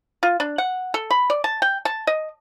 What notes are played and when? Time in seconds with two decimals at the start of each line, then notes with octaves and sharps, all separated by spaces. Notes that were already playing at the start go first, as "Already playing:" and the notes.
0.23 F4
0.40 D4
0.58 F#5
0.94 A4
1.11 B5
1.30 D5
1.44 A5
1.62 G5
1.85 A5
2.07 D#5